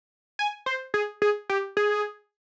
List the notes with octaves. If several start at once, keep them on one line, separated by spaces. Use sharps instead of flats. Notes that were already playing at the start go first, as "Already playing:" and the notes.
G#5
C5
G#4
G#4
G4
G#4